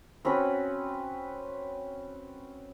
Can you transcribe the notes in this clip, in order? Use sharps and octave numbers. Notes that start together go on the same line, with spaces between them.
C4 C#4 F#4 B4